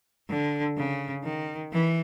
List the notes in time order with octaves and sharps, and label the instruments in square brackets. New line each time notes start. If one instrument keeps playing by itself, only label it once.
[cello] D3
C#3
D#3
E3